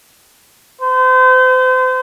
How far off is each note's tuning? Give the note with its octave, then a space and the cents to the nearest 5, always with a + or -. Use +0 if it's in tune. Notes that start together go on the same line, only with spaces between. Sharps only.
C5 -35